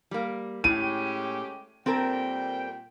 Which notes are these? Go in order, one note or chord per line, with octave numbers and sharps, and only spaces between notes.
G3 A#3
A2 G#3 C#4 G4 D#7
A#2 G3 C4 A4 A#4 G5